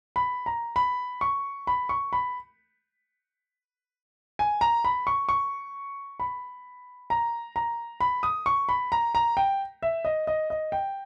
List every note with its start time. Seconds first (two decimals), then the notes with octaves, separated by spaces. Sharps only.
0.16 B5
0.46 A#5
0.76 B5
1.21 C#6
1.67 B5
1.89 C#6
2.13 B5
4.39 G#5
4.61 A#5
4.84 B5
5.07 C#6
5.29 C#6
6.20 B5
7.10 A#5
7.56 A#5
8.01 B5
8.23 D#6
8.46 C#6
8.69 B5
8.92 A#5
9.15 A#5
9.37 G5
9.83 E5
10.05 D#5
10.27 D#5
10.50 D#5
10.72 G5